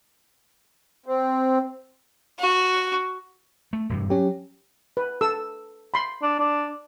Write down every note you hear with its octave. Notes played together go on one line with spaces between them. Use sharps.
C4
F#4
A3
E1 G2 C3
F#3 C#4 G4
B4
A4 E6
B5 C6
D4
D4